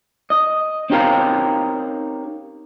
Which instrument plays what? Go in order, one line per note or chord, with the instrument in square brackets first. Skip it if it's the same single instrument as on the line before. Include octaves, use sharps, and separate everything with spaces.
[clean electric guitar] D#5
C4 C#4 D#4 G4 A#4 F5